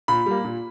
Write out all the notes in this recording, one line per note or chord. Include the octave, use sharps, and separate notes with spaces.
A#2 B5
G3 A#3
A#2